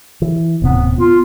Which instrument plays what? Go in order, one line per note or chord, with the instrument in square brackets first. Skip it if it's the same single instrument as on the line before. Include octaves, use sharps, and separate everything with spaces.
[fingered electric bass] E3
[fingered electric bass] D#1 A2 C3 [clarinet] B3
[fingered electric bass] B3 [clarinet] F4